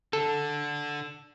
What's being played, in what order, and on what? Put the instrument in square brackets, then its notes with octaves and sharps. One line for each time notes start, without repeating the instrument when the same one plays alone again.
[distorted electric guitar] D3 [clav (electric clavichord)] A4